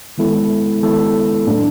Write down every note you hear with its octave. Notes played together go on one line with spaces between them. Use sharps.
D#3 G#3 B3 E4 A4
D#3 G#3 B3 E4 A4
A2 F#3 A3 D4